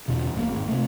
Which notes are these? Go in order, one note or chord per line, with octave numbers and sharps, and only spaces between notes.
E2 B2 D3
D1 G#3 A#3
G#1
C3 A3